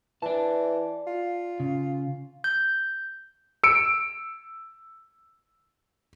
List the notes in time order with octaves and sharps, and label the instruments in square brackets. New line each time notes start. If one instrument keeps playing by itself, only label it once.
[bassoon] E3 [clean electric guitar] D5 A5
[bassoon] F4
[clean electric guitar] C#3
[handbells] G6
[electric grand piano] E6 C#7 D7